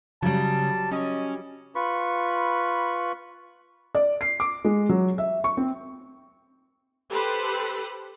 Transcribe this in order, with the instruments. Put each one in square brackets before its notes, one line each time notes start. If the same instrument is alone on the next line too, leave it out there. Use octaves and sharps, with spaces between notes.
[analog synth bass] C#3 [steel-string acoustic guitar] F#3 G3 [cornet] A5
[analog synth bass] C#4 [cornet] D#5
[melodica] F4 B4 B5 C#6
[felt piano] D5
C7
D6
G#3
F#3
E5
C#6
C4
[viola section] G4 A4 B4 C5 B5